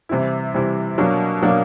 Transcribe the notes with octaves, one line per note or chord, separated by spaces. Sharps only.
C3 E3 G3 C4 E4
C3 E3 G3 C4 E4
B2 F#3 A#3 D4
B2 F#3 A#3 D4